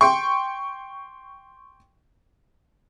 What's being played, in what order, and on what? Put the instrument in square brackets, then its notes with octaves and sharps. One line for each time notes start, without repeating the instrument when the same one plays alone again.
[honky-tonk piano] G5 C6 C#6